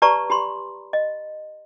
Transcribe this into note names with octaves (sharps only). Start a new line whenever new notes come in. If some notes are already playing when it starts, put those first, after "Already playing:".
G4 B4 D5 A5 A#5 C#6
G4 B5 C6
D#5